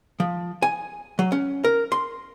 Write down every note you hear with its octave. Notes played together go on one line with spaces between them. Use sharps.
F3
G#5
F#3
C#4
A#4
C6